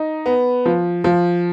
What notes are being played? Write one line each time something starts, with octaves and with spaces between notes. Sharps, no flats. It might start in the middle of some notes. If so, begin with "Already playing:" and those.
Already playing: D#4
B3
F3
F3